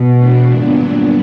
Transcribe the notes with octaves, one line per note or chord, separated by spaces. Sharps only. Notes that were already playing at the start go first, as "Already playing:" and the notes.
Already playing: B2
E3 A3 D4
G2 A#2 D3 F#3 B3 D4